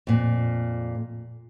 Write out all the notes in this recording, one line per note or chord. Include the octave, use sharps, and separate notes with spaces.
F2 A#2